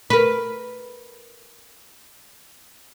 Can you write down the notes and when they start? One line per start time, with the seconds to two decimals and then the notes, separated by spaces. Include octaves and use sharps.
0.10 A#4 B4